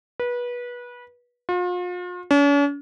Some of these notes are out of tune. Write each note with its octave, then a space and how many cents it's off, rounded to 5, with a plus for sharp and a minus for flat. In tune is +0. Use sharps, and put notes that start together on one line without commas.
B4 -25
F4 +40
C#4 +45